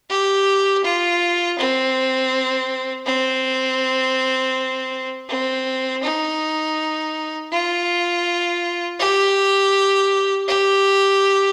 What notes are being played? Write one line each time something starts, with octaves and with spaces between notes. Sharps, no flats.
G4
F4
C4
C4
C4
D#4
F4
G4
G4